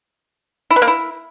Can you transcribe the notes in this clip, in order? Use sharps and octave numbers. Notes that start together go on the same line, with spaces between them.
E4
B4
A#3
E4